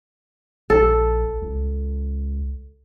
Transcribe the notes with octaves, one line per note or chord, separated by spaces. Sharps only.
A#1 A4
C#2